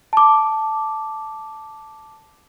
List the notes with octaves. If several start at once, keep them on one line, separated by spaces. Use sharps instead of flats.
A5 D6